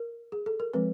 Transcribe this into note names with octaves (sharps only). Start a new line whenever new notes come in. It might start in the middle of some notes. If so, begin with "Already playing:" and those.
Already playing: A#4
G#4
A4
A#4
F3 G#3 C4 B4